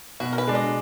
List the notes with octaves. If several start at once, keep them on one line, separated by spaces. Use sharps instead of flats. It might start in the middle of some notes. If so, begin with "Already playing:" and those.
B2 F#4
A#4
B4
G#3 D4
D#5